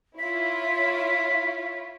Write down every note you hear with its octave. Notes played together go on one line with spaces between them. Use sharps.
E4 F4 C#5 B6